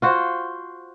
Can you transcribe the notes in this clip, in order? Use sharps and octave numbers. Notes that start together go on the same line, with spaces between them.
F4 F#4 C5